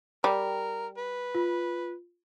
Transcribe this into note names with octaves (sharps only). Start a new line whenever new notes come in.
G3 A#4
B4
F4